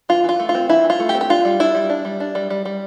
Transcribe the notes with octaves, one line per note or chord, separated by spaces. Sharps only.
E3 F4
E3 F4
A3
F4
C4
E3 E4
E3
F4
A3
G4
C4
G4
D4 F4
G3
D4 E4
G3
D4
G3
D4
G3
G3
G3